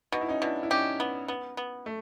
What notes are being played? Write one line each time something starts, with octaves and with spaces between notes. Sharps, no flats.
B2 D#4
E4
C#4 D#4
B2 D4 E4
E4
C#4 D#4 G4
B3
B3
B3
A3